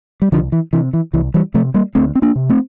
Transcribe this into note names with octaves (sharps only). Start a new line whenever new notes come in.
G3
C2 D3 F3
E3
C3 E3
E3
C2 E3
E3 G3
C3 F3 A3
G3 A#3
D2 A3 C4
C4
A#3 D4
C3
A3 C4